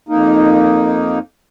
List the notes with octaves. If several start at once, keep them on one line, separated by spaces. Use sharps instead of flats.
F2 A#3 D#4